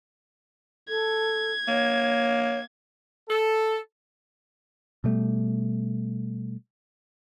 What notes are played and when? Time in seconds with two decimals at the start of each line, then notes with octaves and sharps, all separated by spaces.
0.89 A4 G#6
1.68 A#3 C#5
3.29 A4
5.04 B2 G3 A3